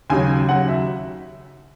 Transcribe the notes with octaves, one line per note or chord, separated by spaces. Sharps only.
D#2 C#3 F#3 G#5
D#2 C#3 F#3 F#5
E5